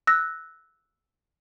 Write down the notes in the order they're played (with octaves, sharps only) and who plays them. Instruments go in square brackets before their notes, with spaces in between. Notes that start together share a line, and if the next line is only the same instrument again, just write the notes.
[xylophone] E6 F#6 A#6